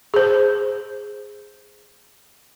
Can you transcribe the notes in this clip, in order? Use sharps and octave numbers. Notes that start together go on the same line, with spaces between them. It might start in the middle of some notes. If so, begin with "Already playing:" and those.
G#4 C5